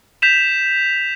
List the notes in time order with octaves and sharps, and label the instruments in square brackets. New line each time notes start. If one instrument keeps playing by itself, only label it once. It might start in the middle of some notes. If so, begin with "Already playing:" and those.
[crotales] G6 B6 E7 F7